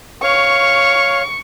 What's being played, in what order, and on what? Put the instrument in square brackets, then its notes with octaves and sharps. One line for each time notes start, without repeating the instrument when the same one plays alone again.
[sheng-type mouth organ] C#5 F5 [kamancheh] C#6